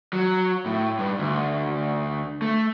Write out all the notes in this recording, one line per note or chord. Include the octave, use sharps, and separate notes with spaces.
F#3
A2
G2
D2
A3